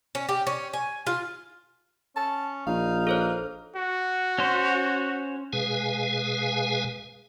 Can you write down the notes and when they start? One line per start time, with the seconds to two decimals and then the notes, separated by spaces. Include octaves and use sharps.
0.15 C#4
0.29 G4
0.47 C#4
0.73 G#5
1.07 F4
2.16 C#4 A5
2.67 A#1 D#4 F5
3.07 A4 C5 C#5
3.76 F#4
4.38 C#4 C5
5.53 B2 G#3 G#4 B4 F5 G#5